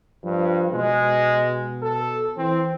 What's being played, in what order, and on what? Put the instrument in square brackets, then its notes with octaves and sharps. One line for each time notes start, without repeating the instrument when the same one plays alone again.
[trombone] G2 [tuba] F3
[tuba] B2 [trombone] G#3
[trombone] A4
[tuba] E3 [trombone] C4